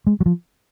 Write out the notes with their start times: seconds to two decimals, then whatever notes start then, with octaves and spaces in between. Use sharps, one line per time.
0.07 G#3
0.20 F#3
0.26 F3